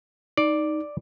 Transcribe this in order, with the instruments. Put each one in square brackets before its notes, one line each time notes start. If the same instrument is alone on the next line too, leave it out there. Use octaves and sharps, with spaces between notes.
[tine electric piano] D#4 [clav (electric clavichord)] D5